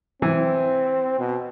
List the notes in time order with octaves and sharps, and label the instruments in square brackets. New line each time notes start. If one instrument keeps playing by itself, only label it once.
[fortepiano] E3 [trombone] C4
[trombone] B2